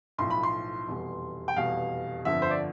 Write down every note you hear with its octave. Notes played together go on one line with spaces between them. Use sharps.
B1 A2 F3 C6
B5
C6
F1 E2 B2 G3
G5
F1 E2 B2 G3 F5
G1 F2 D3 F3 E5
C5
D5